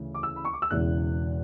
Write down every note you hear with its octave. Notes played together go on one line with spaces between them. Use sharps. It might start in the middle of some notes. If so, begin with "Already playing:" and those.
Already playing: D2 C#3 E3
D6
E6
B5
C#6
D6
E6
E1 E2 C#3 E3 F#6